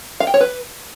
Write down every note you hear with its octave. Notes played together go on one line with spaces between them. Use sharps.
F5
G5
C#5
B4